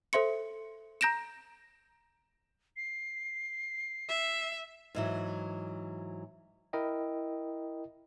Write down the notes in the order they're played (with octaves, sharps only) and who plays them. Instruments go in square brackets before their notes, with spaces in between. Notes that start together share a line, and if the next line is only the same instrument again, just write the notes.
[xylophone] A4 C5 E5 C6 C#7
A#5 G6 A#6 D7 E7
[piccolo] C7
[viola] E5
[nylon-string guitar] G#2 E3 F#3
[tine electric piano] E4 A#4 D#5 G5